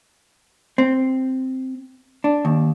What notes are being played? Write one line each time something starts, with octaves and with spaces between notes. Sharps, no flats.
C4
D4
D#2